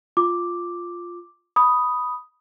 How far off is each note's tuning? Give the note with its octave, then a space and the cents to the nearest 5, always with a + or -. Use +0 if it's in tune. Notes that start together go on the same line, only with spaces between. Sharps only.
F4 +0 D6 +0
B5 +0 D#6 +0